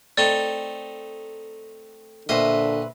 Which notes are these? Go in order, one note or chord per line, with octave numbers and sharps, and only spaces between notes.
A3 C4 D#4 D5
A#1 D3 B4 C5 D#5 E5